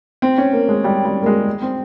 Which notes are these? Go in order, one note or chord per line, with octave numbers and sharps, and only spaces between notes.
C4
C#4
A#3
G#3
G3
G3
A#3
G#3
C4